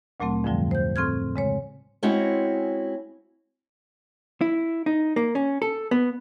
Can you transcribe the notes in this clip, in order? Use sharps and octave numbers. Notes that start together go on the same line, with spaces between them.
D2 A#2 F#3 A3 C4
F2 G#2 D3 F3 G3
C5 G6
A2 C4 C6 F6 G#6
C#3 G#3 C#5
G#3 C4 C#4 E4 F#4
E4
D#4
A#3
C#4
A4
B3